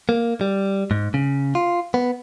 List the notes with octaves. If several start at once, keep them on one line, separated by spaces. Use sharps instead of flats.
A#3
G3
G#2
C#3
F4
B3